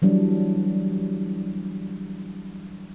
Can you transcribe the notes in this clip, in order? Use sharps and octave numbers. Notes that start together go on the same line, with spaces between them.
E3 F#3 G3 D4